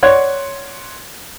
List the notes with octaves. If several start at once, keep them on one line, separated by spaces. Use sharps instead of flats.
C#5 D5 F#5 C6 F#6 G#6